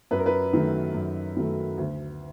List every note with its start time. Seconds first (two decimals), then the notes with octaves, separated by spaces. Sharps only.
0.11 F#2 B4
0.18 A#4
0.26 B4
0.53 D#3 F#3 A3
0.94 F#2
1.36 D#3 F#3 A3
1.78 D2